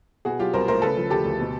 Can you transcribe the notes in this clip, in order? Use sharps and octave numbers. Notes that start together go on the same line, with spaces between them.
B2 F#4 G#4
F#3 F4 G4
C2 A#4 C5
A3 A#4 C5
C#3 A4 B4
F3
D2 G4 A4
D2
B2